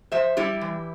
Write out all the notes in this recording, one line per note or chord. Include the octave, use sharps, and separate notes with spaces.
F3 C5 E5
G3 E4 G4
E3